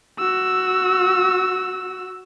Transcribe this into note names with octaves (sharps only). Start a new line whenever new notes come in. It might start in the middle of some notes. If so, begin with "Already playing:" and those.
F#4 E6